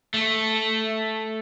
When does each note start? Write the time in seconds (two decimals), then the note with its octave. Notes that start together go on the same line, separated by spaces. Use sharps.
0.14 A3